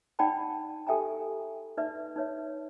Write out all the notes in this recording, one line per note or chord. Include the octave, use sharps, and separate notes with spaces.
D#4 D5 F#5 G5 A5 B5
G4 A4 E5 G5 G#5 A#5
D#4 B4 D5 E5
D#4 B4 C#5 E5